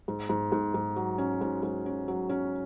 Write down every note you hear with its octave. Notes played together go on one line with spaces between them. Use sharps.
G#2
G#2
G#2
G#2
F#3
C#4
G#2
G#2
C#4
F#3
C#4